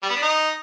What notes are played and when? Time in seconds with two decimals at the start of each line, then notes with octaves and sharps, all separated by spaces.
0.03 G3
0.09 B3
0.16 D4
0.22 D#4